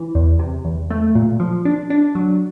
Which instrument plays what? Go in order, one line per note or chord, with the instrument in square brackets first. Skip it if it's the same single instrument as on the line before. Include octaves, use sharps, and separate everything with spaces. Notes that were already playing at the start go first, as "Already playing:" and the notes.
Already playing: [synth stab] E3
E2
C3
E2
A3
A#2
F3
D4
D4
F#3